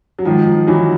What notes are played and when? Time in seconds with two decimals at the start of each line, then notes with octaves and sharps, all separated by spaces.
0.19 F#3
0.25 G#2 D#3 F3
0.47 F3
0.67 E3 F#3